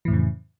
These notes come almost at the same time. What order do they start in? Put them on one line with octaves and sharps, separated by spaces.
E3 A2 F2 C#3